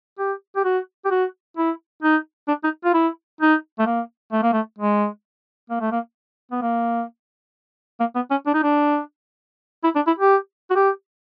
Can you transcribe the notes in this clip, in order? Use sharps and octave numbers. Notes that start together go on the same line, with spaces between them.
G4
G4
F#4
G4
F#4
E4
D#4
D4
D#4
F4
E4
D#4
A3
A#3
A3
A#3
A3
G#3
A#3
A3
A#3
B3
A#3
A#3
B3
C#4
D4
D#4
D4
E4
D4
E4
G4
F#4
G4